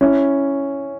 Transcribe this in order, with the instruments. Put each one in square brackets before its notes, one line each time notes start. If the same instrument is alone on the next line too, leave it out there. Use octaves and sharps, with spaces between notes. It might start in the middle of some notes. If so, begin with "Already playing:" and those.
[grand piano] C#4 E4